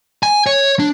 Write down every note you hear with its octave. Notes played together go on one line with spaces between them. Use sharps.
G#5
C#5
D4